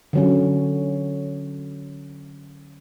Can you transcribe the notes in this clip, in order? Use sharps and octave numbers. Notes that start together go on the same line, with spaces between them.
D3 F#3 C#4